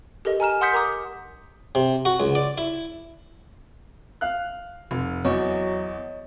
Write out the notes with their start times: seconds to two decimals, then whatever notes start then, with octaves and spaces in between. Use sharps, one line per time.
0.25 G4 A4 A#4 D#5
0.40 G#5 A#5 F6 E7
0.61 F#5 C6 D#6 G6 B6 C#7
0.73 A#4 A#5 D6 D#6
1.75 C3
2.05 F#4
2.20 C#2
2.35 D5
2.58 E4
4.21 F5 F#6
4.91 F1
5.25 E2 F#3 C#5 D#5 C#6